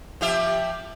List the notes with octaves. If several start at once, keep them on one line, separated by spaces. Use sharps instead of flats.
F3 G4 E5